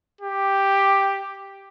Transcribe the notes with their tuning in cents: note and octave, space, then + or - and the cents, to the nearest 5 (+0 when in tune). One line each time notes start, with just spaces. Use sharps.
G4 +5